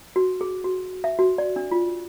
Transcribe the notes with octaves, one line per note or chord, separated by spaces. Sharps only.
F#4
G#4
F#4
E5
F#4
D5
D4
F4